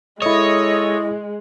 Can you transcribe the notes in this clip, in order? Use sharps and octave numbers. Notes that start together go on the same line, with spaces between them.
G#3 E4 A4 C#5 D#5 D#6